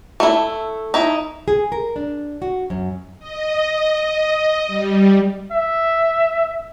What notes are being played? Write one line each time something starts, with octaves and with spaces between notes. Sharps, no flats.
A3 E4
D#4 E4
G#4
A#4
D4
F#4
F#2
D#5
G3
E5